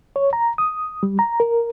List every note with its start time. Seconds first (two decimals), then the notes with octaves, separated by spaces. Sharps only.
0.16 C#5
0.33 A#5
0.58 D#6
1.03 G3
1.19 A#5
1.40 A#4